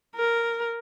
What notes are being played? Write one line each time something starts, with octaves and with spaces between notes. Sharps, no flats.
A#4